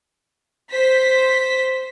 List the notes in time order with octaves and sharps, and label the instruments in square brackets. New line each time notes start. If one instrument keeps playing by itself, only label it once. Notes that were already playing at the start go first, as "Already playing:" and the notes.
[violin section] C5 B6